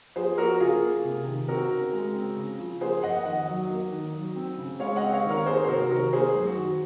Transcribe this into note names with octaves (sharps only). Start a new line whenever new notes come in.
F3 G#4 C5
A#3 F#4 A#4
C#3 F4 G#4
A#3
C3
D#3
C4 F#4 A#4
C#3
G#3
C4
C#3
F3
A#3 G#4 C5
F2 D#5 F#5
D#3 D#5 F#5
F#3
A#3
D#3
F#3
C4
C#3
G#3 C#5 F5
D#5 F#5
C4
C#5 F5
D#3
A#4 C#5
A#3 G#4 C5
C5
C3 F#4 A#4
D#3 F#4 A#4
A#3 G#4 C5
F#2
F#4
D#3